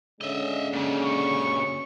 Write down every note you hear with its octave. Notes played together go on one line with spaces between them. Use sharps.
D3 G#3 C#4 D#5 E5
A#2 C#3
C#6